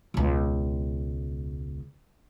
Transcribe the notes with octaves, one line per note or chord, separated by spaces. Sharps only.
E1 C#2